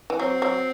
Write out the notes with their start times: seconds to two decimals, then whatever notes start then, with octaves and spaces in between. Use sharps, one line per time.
0.10 E3
0.19 F#3 C4
0.42 F#3